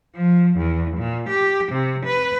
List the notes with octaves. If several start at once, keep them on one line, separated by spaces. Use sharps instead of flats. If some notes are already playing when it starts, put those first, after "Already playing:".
F3
E2
A#2
G4
C3
B4